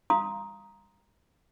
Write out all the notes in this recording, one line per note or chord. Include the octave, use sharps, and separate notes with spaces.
F5 A#5 C6 D#6